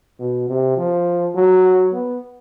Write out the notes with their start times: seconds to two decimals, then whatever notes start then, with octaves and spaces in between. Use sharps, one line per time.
0.19 B2
0.49 C3
0.77 F3
1.35 F#3
1.92 B3